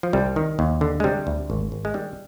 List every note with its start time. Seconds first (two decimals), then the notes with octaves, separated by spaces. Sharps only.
0.03 F3
0.13 C2 G3
0.36 D#3
0.59 D#2
0.81 D3
1.00 G#3
1.04 C3 G3
1.27 D2
1.50 G#1
1.72 G#1
1.85 G#3
1.94 D#3 G3